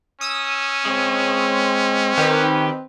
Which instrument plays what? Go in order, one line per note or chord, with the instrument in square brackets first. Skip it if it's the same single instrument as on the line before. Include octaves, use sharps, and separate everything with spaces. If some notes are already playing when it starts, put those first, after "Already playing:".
[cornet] C#4 [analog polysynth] D#6 E6
[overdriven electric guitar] G#3 C#5 [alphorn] C4
[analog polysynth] D#3 B4 [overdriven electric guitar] G4